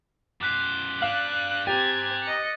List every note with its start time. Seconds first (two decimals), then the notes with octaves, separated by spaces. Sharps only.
0.41 F#2 C5 D6 F#6 B6
1.02 G3 D4 F5 F#6 F#7
1.67 C4 G4 G#5 A#5 G#6 A6
2.23 D#5 C#7